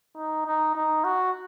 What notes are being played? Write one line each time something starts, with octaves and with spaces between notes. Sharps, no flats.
D#4
D#4
D#4
F#4